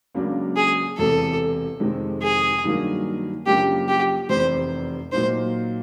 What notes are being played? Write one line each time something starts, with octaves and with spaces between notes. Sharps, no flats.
C#2 C#3 F#3 A#3 D4
G#4
E1 E2 C3 A4
F2 C3 D#3 G#3 C4
G#4
G2 D#3 F#3 A#3
F#2 C#3 F3 A#3 D4 G4
G4
F1 E2 C3 C5
A#2 F#3 A#3 D#4 C5